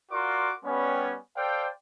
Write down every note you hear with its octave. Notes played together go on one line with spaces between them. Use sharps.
F4 F#4 A#4 D5 C6 D6
G3 B3 C#4
A4 C5 D5 F5 G5